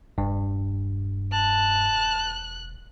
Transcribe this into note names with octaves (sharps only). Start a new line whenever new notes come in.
E1 G2
A5 F#6